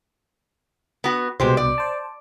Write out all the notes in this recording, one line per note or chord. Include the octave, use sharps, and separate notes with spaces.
B3 F#4
C2 B2 G#3 G4 C5
D5
C5 A5